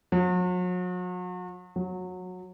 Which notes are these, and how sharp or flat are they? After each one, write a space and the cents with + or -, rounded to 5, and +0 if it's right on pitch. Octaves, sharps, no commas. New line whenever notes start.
F#3 -40
F#3 -20